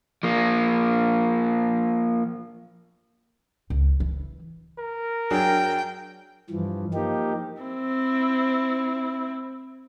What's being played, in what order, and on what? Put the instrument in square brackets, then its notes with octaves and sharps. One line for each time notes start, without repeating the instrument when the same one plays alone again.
[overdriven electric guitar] F3 A#3
[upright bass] C#2
E3
[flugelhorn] A#4
[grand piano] F#3 D4 G#4 [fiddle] G5
[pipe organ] G2 E3 F3
F3 A#3 D#4 G4
[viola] C4 E4